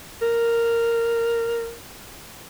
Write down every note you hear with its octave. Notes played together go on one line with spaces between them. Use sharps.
A#4